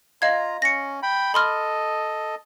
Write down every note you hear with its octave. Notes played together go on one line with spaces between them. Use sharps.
F4 D#5 F5 A#5 G#6
C#4 A#6 C#7
G5 B5
A4 D#5 B5 C6 F6